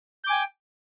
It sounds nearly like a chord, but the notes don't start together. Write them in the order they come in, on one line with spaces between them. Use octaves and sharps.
G6 D6 G#5 G5